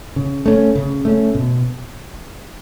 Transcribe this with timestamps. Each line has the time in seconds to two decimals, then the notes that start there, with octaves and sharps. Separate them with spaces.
0.16 C#3
0.46 A3 C#4
0.75 C#3
1.05 A3 C#4
1.35 B2